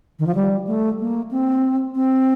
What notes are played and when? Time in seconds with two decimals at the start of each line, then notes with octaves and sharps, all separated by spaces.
0.19 D#3
0.27 F3
0.35 G3
0.67 A3
1.00 A#3
1.31 C4
1.95 C4